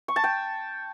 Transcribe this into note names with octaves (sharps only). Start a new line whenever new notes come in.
C#6
A5
G5